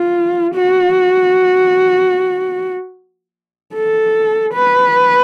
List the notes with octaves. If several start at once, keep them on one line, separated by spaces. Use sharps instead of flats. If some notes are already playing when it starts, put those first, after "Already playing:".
Already playing: F4
F#4
A4
B4